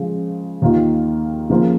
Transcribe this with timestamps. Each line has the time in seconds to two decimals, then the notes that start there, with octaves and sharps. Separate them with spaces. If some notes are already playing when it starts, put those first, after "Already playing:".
Already playing: C#3 F3 G#3
0.62 D#2 D#3 A#3 F4
1.50 C#3 F3 A#3 F4